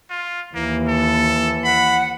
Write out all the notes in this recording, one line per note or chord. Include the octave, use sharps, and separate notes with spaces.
F4
D#2 E3 A#3
A4
F#5 B5